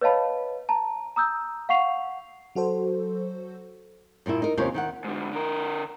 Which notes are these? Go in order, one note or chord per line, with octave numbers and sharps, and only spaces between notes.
B4 C#5 D#5 F5 A5 B5
A5 A#5
A#5 D#6 E6 G6
F5 F#5 C#6 C7 F7
F#3 F#4 A4 C5
G2 A#2 A#3 E4
D#4 A#4
D#2 C3 C#4 F4 A#4 C#5
D#3 E4 F#5
G#2 D3
D3 A#4